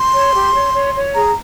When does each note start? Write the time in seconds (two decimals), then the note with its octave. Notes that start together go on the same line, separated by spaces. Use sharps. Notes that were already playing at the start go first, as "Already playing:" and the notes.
Already playing: C6
0.13 C#5
0.34 G4
0.54 C#5
0.73 C#5
0.95 C#5
1.14 G#4 A#5